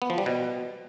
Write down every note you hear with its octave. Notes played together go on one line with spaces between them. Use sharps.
B3
F3
G3
B2